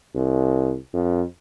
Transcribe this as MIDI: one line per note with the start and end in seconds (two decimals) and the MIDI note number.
0.15 0.76 36
0.93 1.24 41